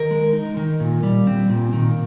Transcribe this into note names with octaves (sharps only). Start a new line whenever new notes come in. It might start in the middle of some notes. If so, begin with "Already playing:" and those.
Already playing: D#3 A#4
G#3
D#4
D#3
A#2
G3
C4
A#2
D#3